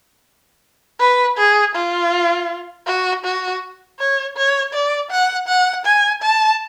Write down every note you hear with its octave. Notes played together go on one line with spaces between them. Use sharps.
B4
G#4
F4
F#4
F#4
C#5
C#5
D5
F#5
F#5
G#5
A5